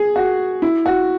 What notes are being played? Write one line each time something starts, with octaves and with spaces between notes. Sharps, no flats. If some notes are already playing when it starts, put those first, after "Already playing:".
Already playing: G#4
F#4
E4
F#4